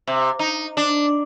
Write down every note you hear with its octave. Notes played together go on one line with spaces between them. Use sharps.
C3
D#4
D4